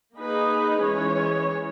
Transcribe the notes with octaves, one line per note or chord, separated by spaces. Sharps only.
A#3 D#4 G#4 B4
E3 G#3 C#4 G#4 C#5